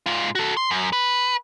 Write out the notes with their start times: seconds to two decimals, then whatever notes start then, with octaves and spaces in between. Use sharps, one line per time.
0.06 G#2 F4
0.35 F#4 A4
0.57 C6
0.71 F#2
0.93 B4